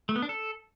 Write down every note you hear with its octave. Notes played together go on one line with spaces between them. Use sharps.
A3
B3
D4
A4